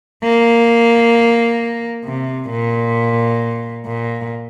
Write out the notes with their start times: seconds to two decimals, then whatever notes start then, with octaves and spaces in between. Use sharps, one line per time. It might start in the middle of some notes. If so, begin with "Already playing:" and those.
0.24 A#3
2.05 C3
2.50 A#2
3.86 A#2